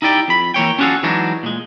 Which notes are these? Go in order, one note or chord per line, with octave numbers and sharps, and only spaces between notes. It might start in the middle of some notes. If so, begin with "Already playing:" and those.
D#4 E4 G4 D5 G5
F2 B5
E3 A#3 C#5 G5
C#4 D4 F4 F#4 G#4 A4
E3 F#3 G#3 D4 D#4 F#4
A#2 G#3